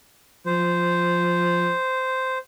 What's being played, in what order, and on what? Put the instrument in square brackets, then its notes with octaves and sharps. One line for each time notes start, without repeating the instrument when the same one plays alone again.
[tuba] F3 [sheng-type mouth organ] C5